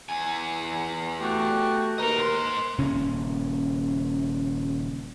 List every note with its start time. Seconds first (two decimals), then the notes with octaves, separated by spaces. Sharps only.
0.09 E2 G#5
1.20 A3 F#4 G4
1.98 D#2 A#4 B4 D#5 A#5
2.16 G#2 C6
2.78 D#1 C#3 C#4